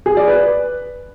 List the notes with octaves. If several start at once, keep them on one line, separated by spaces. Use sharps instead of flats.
G#4
D5
B4